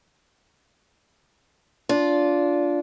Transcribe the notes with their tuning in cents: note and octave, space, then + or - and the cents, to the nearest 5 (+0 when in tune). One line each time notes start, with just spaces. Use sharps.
D4 -20 F4 +0